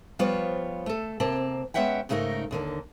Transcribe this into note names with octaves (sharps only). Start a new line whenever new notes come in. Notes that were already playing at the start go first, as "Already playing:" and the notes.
F3 G3 B3 F4 C5 C#5
A3 A4
C3 A#3 C4 A5
G#3 B3 C#4 E5 F#5 G5
G#2 C#3 A3 D#4 A#4
D#2 D3 A#3